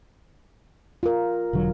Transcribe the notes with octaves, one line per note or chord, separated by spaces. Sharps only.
F4 A#4
E1 D3 F#3